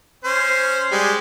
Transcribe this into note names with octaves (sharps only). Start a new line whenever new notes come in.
C#4 C5
G3 G#3